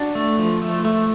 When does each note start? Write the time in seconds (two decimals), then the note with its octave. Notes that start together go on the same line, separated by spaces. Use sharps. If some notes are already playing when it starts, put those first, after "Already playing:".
Already playing: D4 F#4
0.15 A3
0.39 F3
0.62 A3
0.85 A3